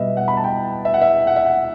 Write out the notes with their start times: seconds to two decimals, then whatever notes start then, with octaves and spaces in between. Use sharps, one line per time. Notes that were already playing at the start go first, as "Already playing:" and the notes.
Already playing: B2 G3 B4 D#5 E5
0.17 F#5
0.28 B5
0.37 A5
0.44 G5
0.85 E5
0.94 F#5
1.01 E5
1.27 F#5
1.36 E5
1.46 F#5